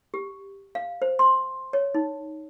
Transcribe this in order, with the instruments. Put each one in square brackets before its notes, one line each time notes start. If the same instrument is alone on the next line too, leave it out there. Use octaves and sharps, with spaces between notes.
[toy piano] G4
F5
C5
C6
C#5
D#4